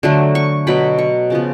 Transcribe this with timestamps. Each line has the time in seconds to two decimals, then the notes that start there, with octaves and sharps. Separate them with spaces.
0.03 D3 F#3 A3
0.35 C#6
0.67 B2 F#3 B3 B5
0.98 C#6
1.30 C#3 F3 B3